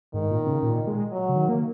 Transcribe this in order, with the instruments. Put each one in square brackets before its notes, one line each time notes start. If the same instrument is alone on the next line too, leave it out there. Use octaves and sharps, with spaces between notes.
[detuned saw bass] G#2 [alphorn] D#3
[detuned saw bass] A#2
C#3
A#2
G#3
[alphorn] F#3
[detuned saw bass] C#3
D#3
A#3